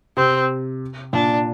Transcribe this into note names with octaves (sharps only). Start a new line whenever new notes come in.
C3 C4
A#2 D4